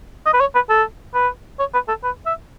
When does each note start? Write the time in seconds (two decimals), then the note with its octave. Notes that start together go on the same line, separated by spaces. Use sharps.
0.26 D#5
0.33 B4
0.40 C#5
0.55 B4
0.69 A4
1.14 B4
1.59 C#5
1.74 B4
1.88 A4
2.03 B4
2.26 E5